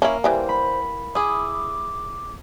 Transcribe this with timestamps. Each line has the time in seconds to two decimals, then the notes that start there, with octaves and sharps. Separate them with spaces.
0.02 A#3 C#4 E4
0.24 E3 G3 C5
0.49 B5
1.15 E4 G#4 D6 D#6